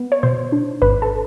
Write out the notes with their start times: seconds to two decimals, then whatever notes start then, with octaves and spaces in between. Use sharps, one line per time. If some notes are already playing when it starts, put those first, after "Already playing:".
Already playing: B3
0.12 C#5
0.23 B2 C5
0.52 D4
0.82 G#1 B4
1.02 A4